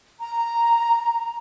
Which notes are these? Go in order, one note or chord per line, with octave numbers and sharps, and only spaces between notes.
A#5